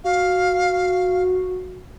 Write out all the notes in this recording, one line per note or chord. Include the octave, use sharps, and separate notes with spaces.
F#4 F5